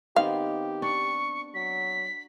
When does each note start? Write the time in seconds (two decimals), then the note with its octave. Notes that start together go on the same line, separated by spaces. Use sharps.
0.16 D#3 B3 C4 G4 F5
0.82 D4 C#6
1.54 F#3 B6